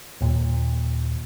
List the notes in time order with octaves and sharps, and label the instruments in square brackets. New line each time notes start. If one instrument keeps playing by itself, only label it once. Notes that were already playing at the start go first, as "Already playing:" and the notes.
[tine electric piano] D#2 A#2